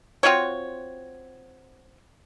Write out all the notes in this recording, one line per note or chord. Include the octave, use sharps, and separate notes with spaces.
C4 F4 F#4 C#5